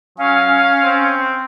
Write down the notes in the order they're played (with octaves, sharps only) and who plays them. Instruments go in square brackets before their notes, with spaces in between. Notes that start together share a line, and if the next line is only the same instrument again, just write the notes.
[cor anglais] F#3 [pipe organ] C#4 [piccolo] F5
[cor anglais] C4